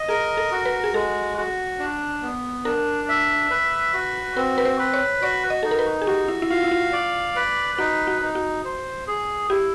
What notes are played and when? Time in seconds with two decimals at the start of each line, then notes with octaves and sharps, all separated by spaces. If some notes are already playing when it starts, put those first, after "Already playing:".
Already playing: D#5
0.08 G#4 A#4
0.37 A4
0.52 F#4
0.65 B4
0.84 G#4
0.94 G#3 A4
1.38 F#4
1.79 D4
2.22 B3
2.65 D4 A#4
3.08 E5
3.50 B4
3.94 F#4
4.37 C4 B4
4.58 B4
4.65 C5
4.79 B4
4.94 C#5
5.22 F#4 D5
5.50 D#5
5.63 D#4 A4
5.71 A#4
5.79 B4
6.02 G#4
6.07 F#4 G4
6.28 E4
6.42 E4
6.50 F4 F5
6.64 E4
6.71 F4
6.93 D5
7.36 B4
7.78 D#4 F#4
8.07 F#4
8.22 D#4
8.35 F#4
8.64 C5
9.07 G#4
9.50 E4 G4